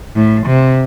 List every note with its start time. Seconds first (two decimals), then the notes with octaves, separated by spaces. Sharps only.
0.15 A2
0.47 C3